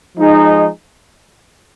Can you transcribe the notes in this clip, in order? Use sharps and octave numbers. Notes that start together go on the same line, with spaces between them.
F3 G#3 D#4 G#4